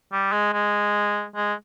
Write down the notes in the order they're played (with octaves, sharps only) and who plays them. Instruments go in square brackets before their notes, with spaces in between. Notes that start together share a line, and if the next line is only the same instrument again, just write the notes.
[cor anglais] G3
G#3
G#3
G#3